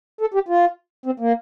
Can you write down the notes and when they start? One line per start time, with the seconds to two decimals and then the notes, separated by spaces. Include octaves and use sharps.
0.21 A4
0.34 G4
0.48 F4
1.06 C4
1.20 A#3